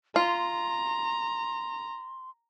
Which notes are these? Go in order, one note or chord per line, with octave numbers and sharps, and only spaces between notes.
F4 A#5 C6